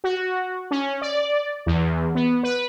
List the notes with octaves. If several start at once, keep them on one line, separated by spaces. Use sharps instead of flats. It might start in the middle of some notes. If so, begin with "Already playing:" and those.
F#4
C#4
D5
E2
B3
B4